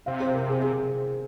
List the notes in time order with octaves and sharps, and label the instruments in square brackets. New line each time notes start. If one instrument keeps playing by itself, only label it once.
[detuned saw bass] C3 [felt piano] F5
[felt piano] C5
A#4
G#4
G#4